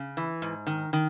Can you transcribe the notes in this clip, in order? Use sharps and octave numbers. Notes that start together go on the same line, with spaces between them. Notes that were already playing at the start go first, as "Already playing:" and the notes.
Already playing: C#3
E3
G#2
D#3
D#3